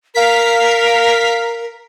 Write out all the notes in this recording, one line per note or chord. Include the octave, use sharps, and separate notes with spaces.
A#4 F5 B6